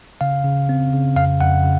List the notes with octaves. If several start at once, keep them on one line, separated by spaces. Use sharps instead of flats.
C#3 F5
C#3
C4
C#3
F2 F5
F2 F#5
C#3